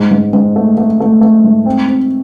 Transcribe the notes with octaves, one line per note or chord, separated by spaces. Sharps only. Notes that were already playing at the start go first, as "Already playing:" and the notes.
Already playing: G#2
G#2
G#2
A3
A3
A3
A3
G#2
C4
C4